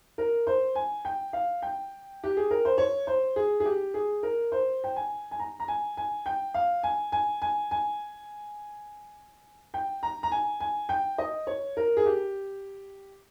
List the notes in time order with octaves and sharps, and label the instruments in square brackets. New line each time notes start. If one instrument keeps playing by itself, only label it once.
[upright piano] A#4
C5
G#5
G5
F5
G5
G4
G#4
A#4
C5
C#5
C5
G#4
G#4
G4
G#4
A#4
C5
G5
G#5
G#5
A#5
A#5
G#5
G#5
G5
F5
G#5
G#5
G#5
G#5
G5
A#5
A#5
G#5
G#5
G5
D#5
C#5
A#4
G#4
G4